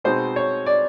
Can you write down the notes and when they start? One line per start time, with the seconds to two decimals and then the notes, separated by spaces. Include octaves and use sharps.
0.04 B2 G#3 C4 D#4 C5
0.36 C#5
0.66 D5